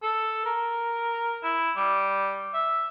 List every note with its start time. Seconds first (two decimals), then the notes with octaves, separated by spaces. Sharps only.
0.03 A4
0.46 A#4
1.43 E4
1.76 G3
2.54 E5